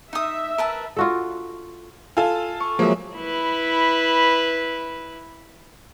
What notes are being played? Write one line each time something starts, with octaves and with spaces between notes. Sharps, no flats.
D#4 E5 D#6
A#4 B4 A5
F4 F#4 A4
F4 A4 G#5
C#6
F3 F#3 G#3 A#3 G#4 C#5 E5
E4 B4